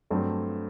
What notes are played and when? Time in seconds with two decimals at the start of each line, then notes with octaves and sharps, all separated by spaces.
0.10 G2 F#3 A3 C4